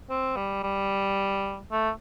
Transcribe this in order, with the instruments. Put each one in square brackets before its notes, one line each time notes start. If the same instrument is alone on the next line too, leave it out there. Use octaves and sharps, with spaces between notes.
[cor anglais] C4
G3
G3
A3